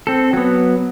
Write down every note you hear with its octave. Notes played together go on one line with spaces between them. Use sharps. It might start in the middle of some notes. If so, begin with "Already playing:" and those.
C4 A4
F#3 B3